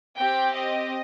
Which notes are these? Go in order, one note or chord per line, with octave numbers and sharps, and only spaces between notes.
C4 G4 G5
D#5